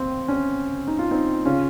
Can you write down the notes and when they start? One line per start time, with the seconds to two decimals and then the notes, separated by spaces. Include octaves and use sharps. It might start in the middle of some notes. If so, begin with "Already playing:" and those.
Already playing: D#2 C4
0.28 C#4
0.87 D#4
0.99 F4
1.11 C4 D#4
1.46 C#3 C#4 F4